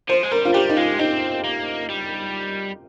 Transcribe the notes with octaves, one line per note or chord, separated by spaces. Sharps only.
F3 C5
G#3
G3 A#4
F4
G3 G4
D#4
G#3 F4
C4 D#4
A#3
G3